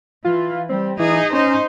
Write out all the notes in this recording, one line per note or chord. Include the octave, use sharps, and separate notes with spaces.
E3 F4
G3 C4
E3 D#4 G#4
C#4 D#4 C5